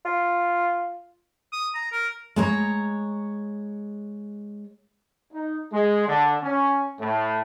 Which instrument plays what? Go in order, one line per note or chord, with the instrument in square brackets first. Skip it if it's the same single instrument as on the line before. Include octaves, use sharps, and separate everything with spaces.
[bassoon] F4
[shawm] D#6
A#5
A#4
[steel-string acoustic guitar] G#3 C#5 A#5
[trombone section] D#4
G#3
D3
C#4
A2